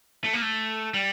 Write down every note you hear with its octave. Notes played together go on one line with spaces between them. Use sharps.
A3
A#3
A3
G3